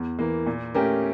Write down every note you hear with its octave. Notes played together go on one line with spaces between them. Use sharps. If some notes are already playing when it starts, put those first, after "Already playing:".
Already playing: E2
E3 A#3
A#2
A3 C#4 G4 A#4